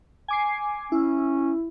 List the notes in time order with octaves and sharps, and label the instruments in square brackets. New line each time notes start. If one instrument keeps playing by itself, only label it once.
[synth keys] G#5 D6 C7
[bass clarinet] C#4 [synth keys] E4